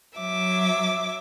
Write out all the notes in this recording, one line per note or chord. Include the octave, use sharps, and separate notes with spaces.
F#3 E5 D6